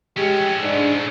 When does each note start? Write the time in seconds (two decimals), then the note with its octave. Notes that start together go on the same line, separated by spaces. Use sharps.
0.17 A2 G#3 C#4 G4
0.61 G#2 D4